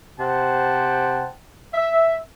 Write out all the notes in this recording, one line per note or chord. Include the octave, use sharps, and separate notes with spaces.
C3 C5 F#5 G5 A5
E5